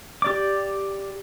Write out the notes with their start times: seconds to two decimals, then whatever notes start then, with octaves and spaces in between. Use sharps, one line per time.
0.22 G4 D5 D6